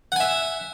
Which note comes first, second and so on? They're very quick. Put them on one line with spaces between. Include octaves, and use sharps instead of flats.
F#5 G#5 E5